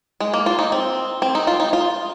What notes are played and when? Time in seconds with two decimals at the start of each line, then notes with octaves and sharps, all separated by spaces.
0.20 G#3
0.34 A#3
0.46 F4
0.59 D#4
0.72 C4
1.22 C4
1.35 D#4
1.47 F4
1.60 D#4
1.73 F4